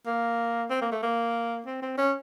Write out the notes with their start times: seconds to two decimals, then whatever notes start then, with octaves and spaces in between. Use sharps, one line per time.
0.06 A#3
0.70 C4
0.82 A#3
0.92 A3
1.03 A#3
1.66 C4
1.82 C4
1.98 C#4